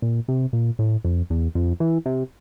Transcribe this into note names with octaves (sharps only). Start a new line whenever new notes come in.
A#2
C3
A#2
A2
F2
E2
F2
E3
C3